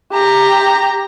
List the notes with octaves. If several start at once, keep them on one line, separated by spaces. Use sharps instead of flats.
G4 A#5